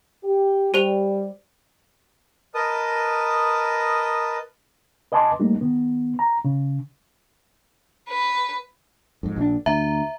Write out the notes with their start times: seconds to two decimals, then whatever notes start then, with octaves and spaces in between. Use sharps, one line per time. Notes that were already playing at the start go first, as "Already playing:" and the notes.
0.24 G4
0.74 G3 G4 C5 F7
2.55 A#4 B4 D#5 A5 D#6
5.12 B4 D#5 G#5 A5 C6 D6
5.40 G3 A3 A#3 D#4
5.61 D#3 B3
6.19 A#5
6.45 C#3
8.09 B4
9.23 F2 G#2
9.36 A#1 C#3 D4
9.66 D2 E5 A#5